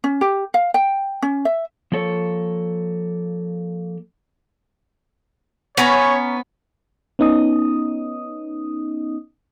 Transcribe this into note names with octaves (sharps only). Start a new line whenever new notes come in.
C#4
G4
F5
G5
C#4
E5
F3 A#3 A4 C#5
B3 C#4 C#5 G#5 A#5
B3 C#4 D#4 D#5 D#6